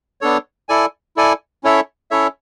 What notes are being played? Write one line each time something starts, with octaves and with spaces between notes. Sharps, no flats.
B3 D4 A4 C#5
E4 A4 D5 G#5
E4 A4 D5 G#5
C#4 E4 A4 C#5 E5
C#4 E4 A4 C#5 E5